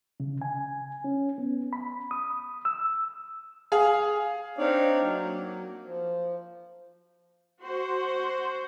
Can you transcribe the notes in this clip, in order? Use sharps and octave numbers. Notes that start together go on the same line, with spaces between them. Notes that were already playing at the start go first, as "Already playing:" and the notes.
C#3
G#5
C#4
B3
B5
D#6
E6
G#4 F5
C4 D4 D#4 C#5 D5 F5
F#3 A#3
F3
F#4 C5